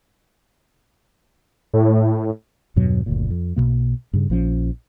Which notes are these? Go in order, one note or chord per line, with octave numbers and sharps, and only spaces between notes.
A2
E2 G2 B2 F#3
F#1 D2 A#2
F2
B1 F2 B2 A#3
G2 C#3
A#1 F3 C4 C#4